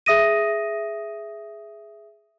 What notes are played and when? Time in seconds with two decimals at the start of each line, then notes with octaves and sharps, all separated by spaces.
0.06 G#4 E5 D#6 A#6 D#7